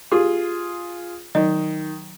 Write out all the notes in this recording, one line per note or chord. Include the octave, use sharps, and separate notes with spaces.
F4 G4 G#4
D#3 F#3 D#5